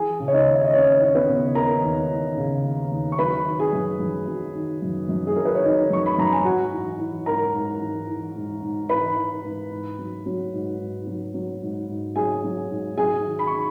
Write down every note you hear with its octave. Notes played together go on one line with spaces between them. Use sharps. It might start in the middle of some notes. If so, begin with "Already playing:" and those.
Already playing: E3 G#4 G#5
C#3
C#5
D#4 D#5
D#2
E5
D#5
D#2 C#4 C#5
E3 C#5
B3 B4
C#3
D#2 A#4 A#5
D#2
E3
C#3
D#2
D#2
C#6
F#3 B4 B5
D#3
G#4 G#5
F#2
F#2
F#3
D#3
F#2
F#2
G#4
F#3 A#4
B4
C#5
D#3 D#4 D#5
F#2 C#6
B5
F#2 A#5
G#5
G#2 F#4 F#5
E3
E3
G#2 A#4 A#5
G#2
E3
E3
G#2
G#2
E3 B4 B5
E3
G#2
G#2
F#3
F#3
G#2
G#2
F#3
F#3
G#2
G#2
F#3 G#4 G#5
F#3
G#2
F#3 G#4 G#5
D#3
B5
C#6